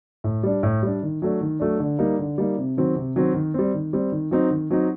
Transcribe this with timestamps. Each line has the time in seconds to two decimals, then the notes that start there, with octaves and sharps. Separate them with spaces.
0.24 A2
0.43 G3 D4
0.63 A2
0.83 G3 D4
1.03 D#3
1.22 F#3 A3 D4
1.41 D#3
1.60 F#3 A3 D4
1.80 D3
1.99 G3 A#3 D#4
2.19 D3
2.38 G3 A#3 D#4
2.58 C3
2.77 D#3 F#3 C4
2.96 C3
3.16 D#3 F#3 C4
3.34 D#3
3.54 G3 C4
3.74 D#3
3.93 G3 C4
4.12 D#3
4.31 F#3 C4 D#4
4.51 D#3
4.70 F#3 C4 D#4